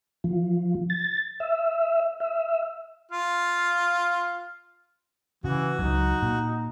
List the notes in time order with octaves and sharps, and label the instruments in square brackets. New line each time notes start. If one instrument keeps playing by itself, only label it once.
[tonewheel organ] F3
A6
E5
E5
[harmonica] F4 F5
[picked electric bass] C#3 [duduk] E3 [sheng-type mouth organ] F#4
[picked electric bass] C#2 F#3 [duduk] D#4
[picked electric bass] A#2